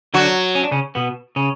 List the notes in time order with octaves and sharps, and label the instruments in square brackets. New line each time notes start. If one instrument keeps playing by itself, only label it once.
[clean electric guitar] D3 D4 [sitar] F#3 F#4
[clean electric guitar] C#4
D4
C#3 C#4
B2 B3
C#3 C#4